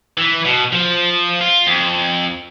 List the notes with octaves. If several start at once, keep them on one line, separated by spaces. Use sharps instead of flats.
E3
B2
F3
F4
F2